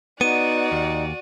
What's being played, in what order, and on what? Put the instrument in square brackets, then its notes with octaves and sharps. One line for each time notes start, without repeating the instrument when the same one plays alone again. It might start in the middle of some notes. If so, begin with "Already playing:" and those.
[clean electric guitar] B3 [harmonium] D#4 [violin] F#4 D5 [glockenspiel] D#7
[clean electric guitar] D#2